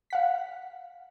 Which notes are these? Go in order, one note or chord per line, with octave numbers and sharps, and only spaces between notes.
F5 F#5 B6